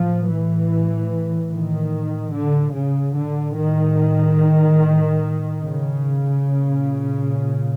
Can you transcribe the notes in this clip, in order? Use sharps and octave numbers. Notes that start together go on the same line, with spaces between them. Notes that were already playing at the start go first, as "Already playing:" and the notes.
Already playing: A2 F3
E3
D#3
D3
C#3
A2 D3
D#3
C#3
A#2